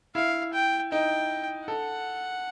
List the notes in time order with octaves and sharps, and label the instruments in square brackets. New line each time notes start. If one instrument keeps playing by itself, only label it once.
[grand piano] E4 [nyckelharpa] F5
[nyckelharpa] G5
[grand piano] D#4 [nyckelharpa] G5
[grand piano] A4 [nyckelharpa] F#5